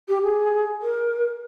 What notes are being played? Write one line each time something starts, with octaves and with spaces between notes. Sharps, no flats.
G4
G#4
A#4